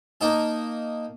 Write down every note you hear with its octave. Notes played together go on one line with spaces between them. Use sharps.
A#3 D#4 A5